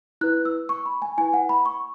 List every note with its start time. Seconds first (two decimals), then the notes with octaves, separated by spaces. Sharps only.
0.21 E4 B4 F#6
0.45 E6
0.69 C#6
0.86 B5
1.02 G#5
1.18 E4 G#5
1.20 B4
1.34 F#5
1.49 B5
1.66 C#6